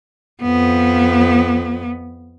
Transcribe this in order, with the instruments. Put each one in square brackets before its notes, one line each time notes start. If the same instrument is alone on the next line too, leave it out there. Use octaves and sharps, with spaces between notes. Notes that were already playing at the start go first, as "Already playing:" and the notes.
[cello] F2 B3